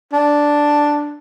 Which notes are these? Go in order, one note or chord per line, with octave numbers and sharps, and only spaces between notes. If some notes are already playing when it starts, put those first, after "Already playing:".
D4